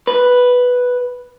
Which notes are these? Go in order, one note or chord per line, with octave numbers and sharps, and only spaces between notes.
B4